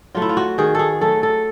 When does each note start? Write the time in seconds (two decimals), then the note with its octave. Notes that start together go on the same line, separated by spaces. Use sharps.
0.15 F#3 A3 F4
0.22 E4
0.29 F4
0.37 F#4
0.58 D#3 G#4
0.75 G#4 A4
1.01 F#3 A3 A4
1.23 A4